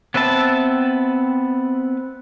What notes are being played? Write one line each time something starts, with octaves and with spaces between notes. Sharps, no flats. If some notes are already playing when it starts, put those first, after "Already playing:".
B3 C4 B4 E5 A5